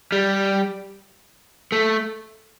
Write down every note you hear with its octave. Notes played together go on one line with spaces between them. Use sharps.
G3
A3